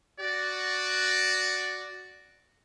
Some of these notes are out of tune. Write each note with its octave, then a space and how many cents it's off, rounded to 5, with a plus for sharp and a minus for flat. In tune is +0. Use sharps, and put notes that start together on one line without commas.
F#4 +0 D5 +0